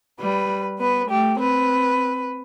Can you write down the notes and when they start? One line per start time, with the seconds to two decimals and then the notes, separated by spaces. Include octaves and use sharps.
0.20 G3 B4
0.79 B3 B4
1.09 A3 G4
1.38 C4 B4